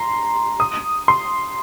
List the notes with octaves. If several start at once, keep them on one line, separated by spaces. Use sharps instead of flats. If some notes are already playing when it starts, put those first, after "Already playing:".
Already playing: A#5 C6
D#6
C6